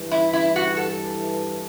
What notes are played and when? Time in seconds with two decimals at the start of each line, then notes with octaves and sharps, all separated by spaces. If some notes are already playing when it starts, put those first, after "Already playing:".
Already playing: G2 E3 G3
0.11 E4
0.33 E4
0.56 F#4
0.77 A4